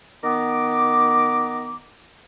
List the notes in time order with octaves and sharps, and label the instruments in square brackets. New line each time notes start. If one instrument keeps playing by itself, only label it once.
[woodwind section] D#3 B3 A#5 D6